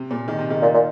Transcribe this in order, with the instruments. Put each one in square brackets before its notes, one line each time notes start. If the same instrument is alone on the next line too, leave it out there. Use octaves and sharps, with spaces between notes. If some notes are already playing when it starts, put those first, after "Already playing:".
Already playing: [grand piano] C3
A#2
D#3
C3
D#3
[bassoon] A#2
A#2